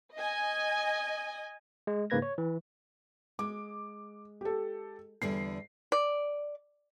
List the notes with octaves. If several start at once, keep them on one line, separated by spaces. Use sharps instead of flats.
D#5 G#5
G#3
G#2 C#3 A#3 B4 G#6 A#6
C#5
E3
G#3 D6
G4 A4
E2 D3 G3 C7
D5